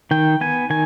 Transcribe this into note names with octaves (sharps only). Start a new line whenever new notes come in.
D#3 G5
B3 G#5
D#3 G#5